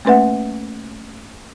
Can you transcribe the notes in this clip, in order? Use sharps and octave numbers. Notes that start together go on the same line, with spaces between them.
A3 A#3 C#4 B4 E5 F#5